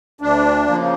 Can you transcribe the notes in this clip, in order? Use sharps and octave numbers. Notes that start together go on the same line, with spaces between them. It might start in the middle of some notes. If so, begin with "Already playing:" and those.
D2 D4
C#3 F3 A#3